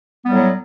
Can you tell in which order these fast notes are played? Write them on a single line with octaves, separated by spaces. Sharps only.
B3 G3 A2 F#3